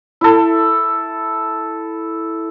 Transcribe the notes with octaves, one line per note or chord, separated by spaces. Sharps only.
E4 A4